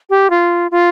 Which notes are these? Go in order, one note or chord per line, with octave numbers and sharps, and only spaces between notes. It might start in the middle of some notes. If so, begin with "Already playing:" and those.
G4
F4
F4